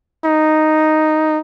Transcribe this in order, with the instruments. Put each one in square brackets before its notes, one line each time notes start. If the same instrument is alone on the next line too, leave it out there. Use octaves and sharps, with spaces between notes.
[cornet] D#4